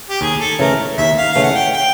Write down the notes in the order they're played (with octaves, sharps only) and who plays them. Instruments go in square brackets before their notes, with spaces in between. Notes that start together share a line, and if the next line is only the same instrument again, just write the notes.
[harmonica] G4
[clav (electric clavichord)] D#2 [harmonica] G#4
[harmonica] A4
[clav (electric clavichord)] C#3 E3 A3 [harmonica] A#4
[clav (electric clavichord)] D#2 [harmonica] E5
[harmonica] F5
[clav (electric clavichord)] C#3 E3 A3 [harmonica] F5
[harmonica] F#5
G5
G5